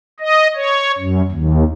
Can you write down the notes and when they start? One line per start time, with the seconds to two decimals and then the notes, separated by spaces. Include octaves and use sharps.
0.20 D#5
0.55 C#5
0.98 F#2
1.31 D#2